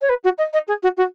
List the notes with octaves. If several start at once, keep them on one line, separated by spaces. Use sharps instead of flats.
C#5
B4
F#4
D#5
D#5
G#4
F#4
F#4